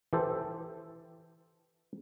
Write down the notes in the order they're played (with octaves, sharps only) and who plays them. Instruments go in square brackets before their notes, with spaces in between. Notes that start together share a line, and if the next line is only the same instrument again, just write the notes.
[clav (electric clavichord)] E3 G4 A4 C5